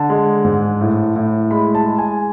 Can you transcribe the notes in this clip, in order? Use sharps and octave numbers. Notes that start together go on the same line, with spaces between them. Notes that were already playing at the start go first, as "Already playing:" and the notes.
Already playing: D3 A5
G#3
G#2
A2
A2
G#3 B5
A5
G#3
G#5